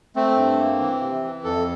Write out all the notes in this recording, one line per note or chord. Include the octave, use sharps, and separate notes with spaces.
A3 C4
G2
A#3
E3
C3
E3
F2 A4